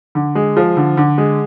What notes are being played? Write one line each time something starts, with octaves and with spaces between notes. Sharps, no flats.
D3
G#3
F3
D3
D3
G#3